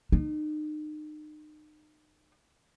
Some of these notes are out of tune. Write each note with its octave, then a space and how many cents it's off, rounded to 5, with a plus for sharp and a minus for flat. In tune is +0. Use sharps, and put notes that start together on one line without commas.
D#4 -35